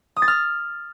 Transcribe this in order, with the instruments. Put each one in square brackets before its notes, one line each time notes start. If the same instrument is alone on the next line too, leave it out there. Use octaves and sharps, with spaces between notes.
[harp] D#6
A6
F6